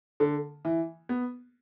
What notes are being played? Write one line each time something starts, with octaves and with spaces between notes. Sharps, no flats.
D3
E3
B3